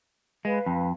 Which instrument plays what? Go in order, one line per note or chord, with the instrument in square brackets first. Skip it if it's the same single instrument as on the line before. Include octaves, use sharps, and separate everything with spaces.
[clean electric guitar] G#3 [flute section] B4 F5
[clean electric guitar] F2